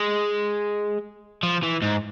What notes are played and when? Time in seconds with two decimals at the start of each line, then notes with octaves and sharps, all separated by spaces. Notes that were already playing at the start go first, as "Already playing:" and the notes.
Already playing: G#3
1.43 F3
1.63 E3
1.82 G#2